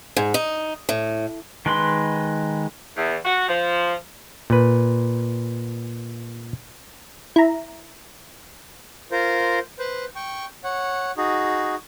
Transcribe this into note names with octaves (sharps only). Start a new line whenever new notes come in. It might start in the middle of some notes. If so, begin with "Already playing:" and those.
G#2
D#4
A2
D#3 G#3 B4 B5 C6
E2
F#4
F3
A#2 B4
E4 A#5
F4 A#4 C5
B4 C5
G5 C#6
C#5 F#5
D#4 F#4 G#4